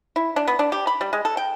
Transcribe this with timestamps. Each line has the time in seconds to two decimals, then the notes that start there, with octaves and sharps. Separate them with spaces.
0.16 E4
0.36 D4
0.48 B3
0.59 D4
0.72 G4
0.87 B5
1.01 G3
1.13 G#3
1.25 A4
1.37 G5